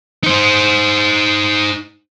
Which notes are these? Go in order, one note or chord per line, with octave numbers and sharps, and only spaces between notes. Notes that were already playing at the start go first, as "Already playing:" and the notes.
D#4 C5